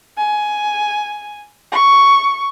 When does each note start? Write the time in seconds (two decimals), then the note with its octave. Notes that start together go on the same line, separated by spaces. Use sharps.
0.17 G#5
1.72 C#6